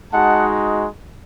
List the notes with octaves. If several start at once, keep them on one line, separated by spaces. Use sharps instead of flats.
G#3 D#4 F#4 F#5 A5